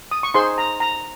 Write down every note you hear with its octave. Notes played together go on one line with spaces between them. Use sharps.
D#6
C#6
D#4 G#4 C5 C6
A#5
A#5